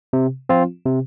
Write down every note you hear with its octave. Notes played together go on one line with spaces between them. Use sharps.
C3
F3 C4 F4
C3